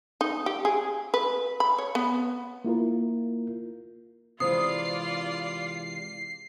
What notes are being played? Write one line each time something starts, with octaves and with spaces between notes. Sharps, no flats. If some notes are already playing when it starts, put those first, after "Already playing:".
D#4
G4
G#4
B4
B5
C#5
B3
A#3 E4 F4 A#4
C3 E3 G#3 F4 C5 D5 D#6 C7